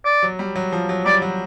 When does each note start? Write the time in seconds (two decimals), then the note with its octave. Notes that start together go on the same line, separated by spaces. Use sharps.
0.05 D5
0.23 F#3
0.39 G3
0.56 F#3
0.72 F3
0.89 F#3
1.06 G3 D5
1.22 F#3